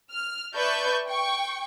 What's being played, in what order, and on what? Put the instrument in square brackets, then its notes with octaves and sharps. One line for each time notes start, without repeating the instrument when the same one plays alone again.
[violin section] F6
B4 D5 E5 A5 C#6 G6
G5 C#6